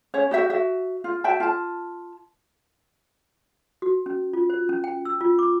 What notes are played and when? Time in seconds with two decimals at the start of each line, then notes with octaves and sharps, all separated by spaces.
0.14 C#4 C#5
0.31 F#4 G4 E5
0.50 F#4 E5
1.04 F4
1.24 F#4 E5 G5 A5
1.40 F4 A5
3.82 F#4
4.06 C#4
4.33 F4
4.50 C5
4.69 C#4
4.84 G5
5.05 E6
5.21 F4
5.39 D6